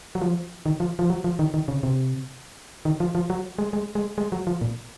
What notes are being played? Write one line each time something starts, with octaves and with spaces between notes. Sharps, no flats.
F#3
F3
D#3
F3
F3
F#3
F3
D#3
D#3
C#3
C3
D#3
F3
F3
F#3
G#3
G#3
G#3
G#3
F#3
F3
A#2